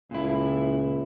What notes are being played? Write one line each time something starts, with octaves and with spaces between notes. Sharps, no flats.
C#2 A#2 E4